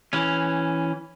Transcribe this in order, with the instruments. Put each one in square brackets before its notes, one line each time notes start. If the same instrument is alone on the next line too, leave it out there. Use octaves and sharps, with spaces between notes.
[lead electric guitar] E3 C#4